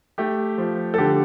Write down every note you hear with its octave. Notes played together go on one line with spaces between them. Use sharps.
A3 G4
F3
A4
D3 G4